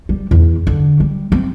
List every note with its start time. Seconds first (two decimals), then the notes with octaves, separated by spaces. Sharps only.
0.09 G3
0.31 E2
0.67 D3
1.00 G3
1.32 C4